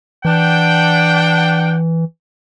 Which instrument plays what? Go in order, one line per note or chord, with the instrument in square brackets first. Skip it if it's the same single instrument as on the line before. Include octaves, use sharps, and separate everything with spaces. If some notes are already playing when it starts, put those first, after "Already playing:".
[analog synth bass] E3 [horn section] D4 F#5 G5